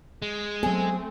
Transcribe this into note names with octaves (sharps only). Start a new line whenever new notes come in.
G#3
F#3 A3 B3 C4 G#4